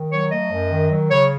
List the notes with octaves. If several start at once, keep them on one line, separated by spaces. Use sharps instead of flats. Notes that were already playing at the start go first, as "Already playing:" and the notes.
Already playing: D#3
F#3 C#5
A3 D#5
F#2
D#3
F#3
C#3 C#5